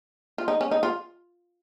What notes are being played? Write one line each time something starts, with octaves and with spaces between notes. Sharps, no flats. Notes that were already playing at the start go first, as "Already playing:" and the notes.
F4
D#4
C#4
D#4
F4